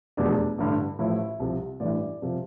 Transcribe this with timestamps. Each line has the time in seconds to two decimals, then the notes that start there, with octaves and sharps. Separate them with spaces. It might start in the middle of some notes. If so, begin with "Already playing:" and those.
0.17 F1 E2 B2 G3 D4
0.58 A1 G2 D3
0.99 A1 A2 F3 E4
1.40 C2 C3 F3
1.80 A1 G2 E3 D5
2.22 C3 F3